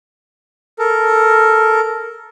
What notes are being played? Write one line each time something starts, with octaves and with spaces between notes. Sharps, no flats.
A4 A#4